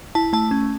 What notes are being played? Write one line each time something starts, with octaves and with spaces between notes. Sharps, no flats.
E4 A5
A3 A5
C#4